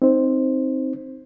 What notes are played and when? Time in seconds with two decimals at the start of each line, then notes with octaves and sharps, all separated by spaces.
0.02 C4 D#4 C5